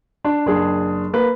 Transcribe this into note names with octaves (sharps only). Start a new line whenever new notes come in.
D4
F#1 D4 G#4
A#3 B4